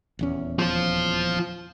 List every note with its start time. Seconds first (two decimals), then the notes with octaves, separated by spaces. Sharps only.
0.19 D#1 E2 C#4
0.59 F3 F4